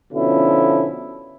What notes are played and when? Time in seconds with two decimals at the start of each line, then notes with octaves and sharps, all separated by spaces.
0.13 B2 D3 F3 C#4 E4